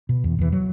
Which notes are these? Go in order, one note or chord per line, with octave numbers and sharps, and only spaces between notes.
B2
E2
E2 E3
F#3